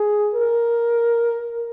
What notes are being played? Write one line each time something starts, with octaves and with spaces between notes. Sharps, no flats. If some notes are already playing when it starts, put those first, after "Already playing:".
Already playing: G#4
A#4